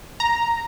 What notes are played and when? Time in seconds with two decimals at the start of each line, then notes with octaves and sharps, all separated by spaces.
0.20 A#5